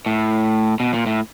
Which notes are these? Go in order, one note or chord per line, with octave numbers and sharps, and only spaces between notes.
A2
B2
A#2
A2